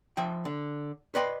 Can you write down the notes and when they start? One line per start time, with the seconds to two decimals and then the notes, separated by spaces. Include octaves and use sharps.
0.17 F3 E5 G5
0.45 D3
1.15 B4 D5 D#5 G5 B5 C6